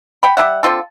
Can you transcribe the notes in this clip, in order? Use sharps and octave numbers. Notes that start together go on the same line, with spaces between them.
F#5 G5 B5
G3 D4 E5 F#5
D3 C4 F4 A4